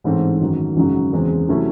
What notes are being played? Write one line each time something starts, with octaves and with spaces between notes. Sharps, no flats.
A1 G#2 E3 A3 C4
F#2 D#3 F#3
G#1 F#2 C#3 F#3
E2 C#3 E3 G#3 C4
C3 F#3 A3 C#4 E4